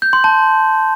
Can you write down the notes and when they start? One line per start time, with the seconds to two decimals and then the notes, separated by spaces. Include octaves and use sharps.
0.02 G6
0.13 C6
0.24 A5